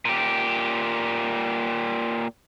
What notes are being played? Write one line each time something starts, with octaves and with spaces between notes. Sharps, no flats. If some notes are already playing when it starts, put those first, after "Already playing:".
A#2 G4